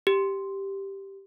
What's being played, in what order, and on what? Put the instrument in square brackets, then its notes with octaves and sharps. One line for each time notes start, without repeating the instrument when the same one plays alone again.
[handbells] G4